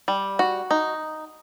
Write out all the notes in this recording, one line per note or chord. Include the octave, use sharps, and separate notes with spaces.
G3
F#4
D#4